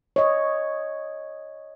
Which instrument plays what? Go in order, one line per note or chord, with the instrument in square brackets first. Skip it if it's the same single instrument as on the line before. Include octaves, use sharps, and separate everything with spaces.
[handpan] C#5 D#5